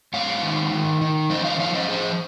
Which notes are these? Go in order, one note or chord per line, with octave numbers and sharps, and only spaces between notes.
G#2 C#5 F5
D#3
D#3
D#3
F3 C5 D#5
C#5 F5
F3 C#5 F5
C5 D#5
F3 G#4 C5